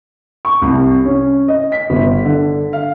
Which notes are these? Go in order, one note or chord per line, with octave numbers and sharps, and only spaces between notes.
C#6
C2
C#4
D#5
B6
G1
D3
F5